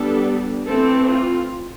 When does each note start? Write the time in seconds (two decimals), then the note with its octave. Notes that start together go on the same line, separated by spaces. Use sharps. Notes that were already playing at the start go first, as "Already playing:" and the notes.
Already playing: G3 B3 D4 A4
0.66 E3 A3 C4 A4
1.08 F4